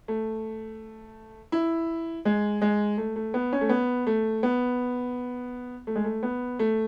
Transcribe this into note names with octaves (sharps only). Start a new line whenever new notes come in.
A3
E4
G#3
G#3
A3
A3
B3
C#4
A3
B3
A3
B3
A3
G#3
A3
B3
A3